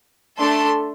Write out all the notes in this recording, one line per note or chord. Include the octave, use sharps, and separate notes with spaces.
A3 D4 A4 C6